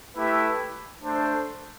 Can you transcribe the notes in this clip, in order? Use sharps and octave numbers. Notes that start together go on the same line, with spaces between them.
A3 E4 G4 B4 E5
A3 D4 A4 C5